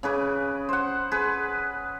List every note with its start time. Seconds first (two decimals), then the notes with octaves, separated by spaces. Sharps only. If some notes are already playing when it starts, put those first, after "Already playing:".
0.03 C#3 G#4 B4 D6
0.69 C5 F#5
1.12 G#4 B4